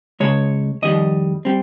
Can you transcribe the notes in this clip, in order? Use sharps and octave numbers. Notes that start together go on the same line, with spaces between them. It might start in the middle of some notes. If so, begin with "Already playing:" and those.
C#2 C#3 G#3 C#5
F2 D#3 G3 D#5
G3 C4